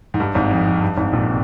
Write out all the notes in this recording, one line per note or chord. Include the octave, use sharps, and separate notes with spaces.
G#2
G2
G#1 G#2
F2
F2
G2
G#1 G#2
A#1 A#2
C3